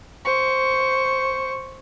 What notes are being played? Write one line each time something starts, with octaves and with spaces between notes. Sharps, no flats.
C5 C#6